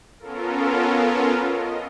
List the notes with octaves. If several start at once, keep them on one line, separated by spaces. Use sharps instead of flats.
B3 C#4 F4 A4 A#4
D#5